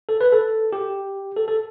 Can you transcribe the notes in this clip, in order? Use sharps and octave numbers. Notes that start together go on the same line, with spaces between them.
A4
B4
A4
G4
A4
A4